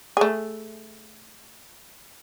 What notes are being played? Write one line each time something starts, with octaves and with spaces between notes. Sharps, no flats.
A3 G#4